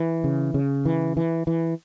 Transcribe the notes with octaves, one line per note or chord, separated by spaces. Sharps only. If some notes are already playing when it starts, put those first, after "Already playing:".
Already playing: E3
C#3
C#3
E3
E3
E3